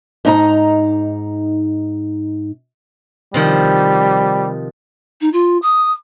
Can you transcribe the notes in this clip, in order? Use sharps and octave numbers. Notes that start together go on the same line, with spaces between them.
G#2 D#4 A#5
C3 D#3 F3 G3
D#4
F4
D#6